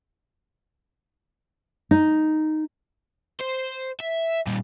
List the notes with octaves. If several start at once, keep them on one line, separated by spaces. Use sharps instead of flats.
D#4
C5
E5
A#2 G3